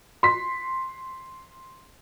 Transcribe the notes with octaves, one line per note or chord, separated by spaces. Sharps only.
C6 B6